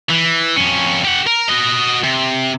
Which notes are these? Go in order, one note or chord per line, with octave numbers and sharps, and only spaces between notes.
E3
F2 C#4
G4 F#5
A#4
F#4 D#5
C3